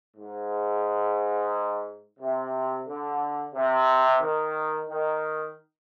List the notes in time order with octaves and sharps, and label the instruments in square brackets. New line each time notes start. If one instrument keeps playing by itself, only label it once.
[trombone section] G#2
C3
D3
C3
D#3
D#3